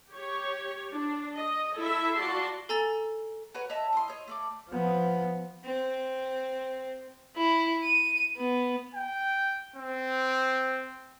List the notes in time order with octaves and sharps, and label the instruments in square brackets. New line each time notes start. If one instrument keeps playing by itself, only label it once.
[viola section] G4 C#5
D4
D#5
E4 A4 E5
F4 F#4 D5 A5 C6
[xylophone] A4 G#5 A#5 E6 A6
[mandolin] F#4 A#4 B4 C#5
C#5 D#5 E5 A5
E4 D#5 C6
C#5 D#5
A3 D5 D6
[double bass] F3 B3
[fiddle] C4
[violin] E4
D#7
B3
[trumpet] G5
C4